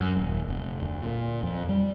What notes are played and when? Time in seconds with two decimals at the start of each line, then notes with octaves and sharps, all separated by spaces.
0.01 F#2
0.17 D#1
0.48 F1
0.80 D2
1.02 A#2
1.43 F2
1.69 G3